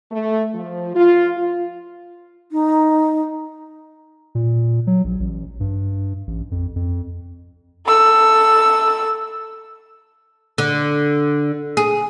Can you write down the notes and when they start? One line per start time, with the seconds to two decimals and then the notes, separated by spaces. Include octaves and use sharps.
0.12 A3
0.55 F3
0.95 F4
1.36 F4
2.52 D#4
4.35 A#2
4.87 F#3
5.04 A#1
5.20 A1
5.60 G2
6.27 A1
6.51 F2
6.76 F2
7.87 A4 E6
10.58 D3
11.77 G#4